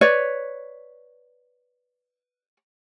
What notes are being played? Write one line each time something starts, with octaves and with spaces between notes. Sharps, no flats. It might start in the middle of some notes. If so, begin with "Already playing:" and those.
B4 C#5 D5